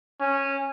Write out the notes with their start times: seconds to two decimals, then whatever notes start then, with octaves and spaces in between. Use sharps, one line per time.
0.20 C#4